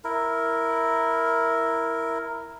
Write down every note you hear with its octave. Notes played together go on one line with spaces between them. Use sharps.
E4 A#4